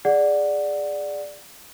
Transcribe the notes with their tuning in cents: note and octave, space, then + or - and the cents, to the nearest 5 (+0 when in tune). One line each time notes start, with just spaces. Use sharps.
G#4 -5 D5 +0 F#5 +0